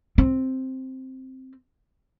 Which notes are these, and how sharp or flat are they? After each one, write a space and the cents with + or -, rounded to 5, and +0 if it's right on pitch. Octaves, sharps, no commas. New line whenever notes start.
C4 +0